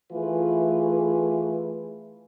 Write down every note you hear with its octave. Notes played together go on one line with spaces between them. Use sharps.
E3 A3 F4 G#4 B4